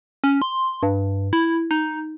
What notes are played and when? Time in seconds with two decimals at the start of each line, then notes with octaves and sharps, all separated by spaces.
0.24 C#4
0.42 C6
0.83 G2
1.33 E4
1.71 D#4